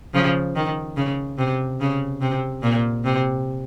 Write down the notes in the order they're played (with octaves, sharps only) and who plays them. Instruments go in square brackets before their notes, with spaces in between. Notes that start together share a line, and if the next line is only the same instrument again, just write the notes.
[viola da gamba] C#3 F3
D#3
C#3
C3
C#3
C3
A#2
C3